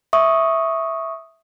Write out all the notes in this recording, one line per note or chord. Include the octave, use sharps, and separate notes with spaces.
E5 C#6 D#6